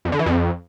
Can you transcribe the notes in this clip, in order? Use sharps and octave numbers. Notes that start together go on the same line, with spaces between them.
F2
D3
E3
F2